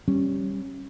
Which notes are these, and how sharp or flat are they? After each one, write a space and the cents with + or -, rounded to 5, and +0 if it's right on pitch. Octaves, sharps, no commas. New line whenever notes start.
G3 -5 C#4 -15